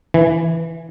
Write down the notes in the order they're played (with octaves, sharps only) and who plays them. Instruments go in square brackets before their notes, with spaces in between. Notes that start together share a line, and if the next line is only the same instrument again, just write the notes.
[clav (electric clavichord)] E3